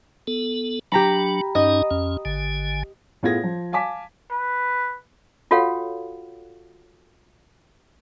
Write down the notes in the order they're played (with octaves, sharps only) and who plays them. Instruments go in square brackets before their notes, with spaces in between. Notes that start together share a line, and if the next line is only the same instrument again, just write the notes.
[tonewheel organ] B3 A4
[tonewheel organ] F#3 D4 [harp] G4 A#5 B5
[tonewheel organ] G2 C#4 D#4 [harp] D#5
[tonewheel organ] F2 C#4
G#1 D3 G#5
[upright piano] A2 B3 F4 G#4 G#6 A#6
F3
F5 G#5 A5 D6 B6
[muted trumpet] B4
[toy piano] F4 F#4 A4 C#5 F5 F#5